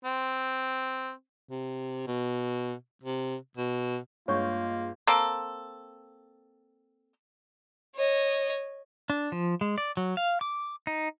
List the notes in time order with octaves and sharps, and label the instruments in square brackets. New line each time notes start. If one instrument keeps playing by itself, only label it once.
[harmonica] C4
[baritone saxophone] C3
B2
C3
B2
[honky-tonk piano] G2 G#3 G6 [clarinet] A#3 [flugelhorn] F4 [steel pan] C#5
[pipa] A#3 C4 A4
[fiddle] C#5 D#5
[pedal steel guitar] D4
F3
G#3
D5
F#3
F5
D6
D#4